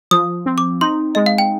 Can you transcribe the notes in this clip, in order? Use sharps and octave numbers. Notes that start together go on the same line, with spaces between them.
F3 D#6
C4
D6
D#4 C6
G#3 D#5
F5
G5